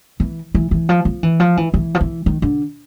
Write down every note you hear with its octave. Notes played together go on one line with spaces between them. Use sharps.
E3
E3
E3
F3
F3
E3
F3
E3
E3
F3
E3
D#3
D3